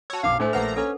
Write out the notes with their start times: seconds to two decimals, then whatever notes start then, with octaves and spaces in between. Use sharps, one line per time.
0.10 F#4 C#5 A5 E6
0.23 B1 F#2 D4 F5 D6
0.40 A2 A3 D4 C5 G#5
0.53 A#1 A#3 B4 F#5 A#5
0.76 C#4 A4